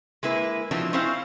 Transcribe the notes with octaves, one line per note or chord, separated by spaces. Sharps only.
G#3 A#3 E4 B4
B2 F3 F#3 C4 D4 E4
C4 C#4 E4 C5 F5